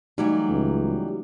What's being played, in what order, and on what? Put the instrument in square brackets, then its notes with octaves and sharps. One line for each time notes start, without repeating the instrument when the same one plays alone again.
[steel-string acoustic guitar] E3 F#3 G3 [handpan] A3 D#4
[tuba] C#2